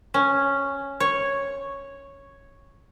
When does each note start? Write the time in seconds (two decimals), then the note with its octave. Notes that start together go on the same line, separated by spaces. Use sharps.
0.14 C#4
1.00 C#5